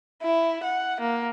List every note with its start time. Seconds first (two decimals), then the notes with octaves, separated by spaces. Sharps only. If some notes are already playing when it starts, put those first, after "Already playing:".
0.22 E4
0.63 F#5
1.01 A#3